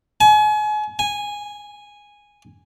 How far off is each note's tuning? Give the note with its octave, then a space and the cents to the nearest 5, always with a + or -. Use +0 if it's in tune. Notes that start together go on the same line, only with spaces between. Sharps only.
G#5 +35
G#5 -10